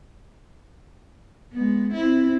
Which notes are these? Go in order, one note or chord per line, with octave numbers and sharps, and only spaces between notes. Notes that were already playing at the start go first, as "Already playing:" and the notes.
G#3 B3
C4 E4